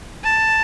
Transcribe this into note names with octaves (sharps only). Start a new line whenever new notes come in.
A5